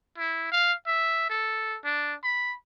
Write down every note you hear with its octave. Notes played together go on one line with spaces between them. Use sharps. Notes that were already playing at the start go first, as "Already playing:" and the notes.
E4
F5
E5
A4
D4
B5